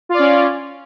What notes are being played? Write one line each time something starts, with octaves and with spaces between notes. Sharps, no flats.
C#4 F4 D5